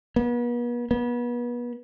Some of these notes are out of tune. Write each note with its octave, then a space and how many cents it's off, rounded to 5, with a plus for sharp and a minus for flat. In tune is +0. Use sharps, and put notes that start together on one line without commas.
B3 -40
B3 -35